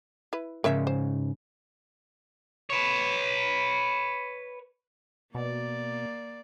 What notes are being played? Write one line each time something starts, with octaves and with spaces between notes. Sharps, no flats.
E4 B4
G#2 C#3 A#4 C#5 E5
C5
B4 C#5
B2 A#3 D5